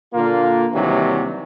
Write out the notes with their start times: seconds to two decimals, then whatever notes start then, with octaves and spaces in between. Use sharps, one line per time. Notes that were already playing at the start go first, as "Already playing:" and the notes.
0.14 A#2 D3 A#3 F4
0.73 D#2 C3 E3 F#3 G3 D4